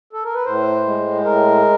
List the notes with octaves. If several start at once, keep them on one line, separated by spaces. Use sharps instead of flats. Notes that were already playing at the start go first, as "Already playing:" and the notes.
A4
A#4
B4
A2 C5
G#3
A2 A#4